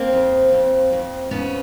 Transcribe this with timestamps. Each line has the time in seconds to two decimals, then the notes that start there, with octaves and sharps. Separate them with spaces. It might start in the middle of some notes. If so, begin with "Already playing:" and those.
Already playing: A#3 C4
0.13 F2
0.53 F2
0.92 F2
1.31 F2 B3 C#4